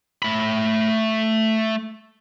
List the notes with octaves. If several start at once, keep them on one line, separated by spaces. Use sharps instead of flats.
A3 B5